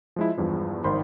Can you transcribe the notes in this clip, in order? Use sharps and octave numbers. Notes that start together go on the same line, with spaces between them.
F3 G#3 E4
E2 G2 F3
G#1 D#3 C5 B5 C6